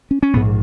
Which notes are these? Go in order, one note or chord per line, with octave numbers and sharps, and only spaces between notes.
C#4
C#4
A#1 G#2 B3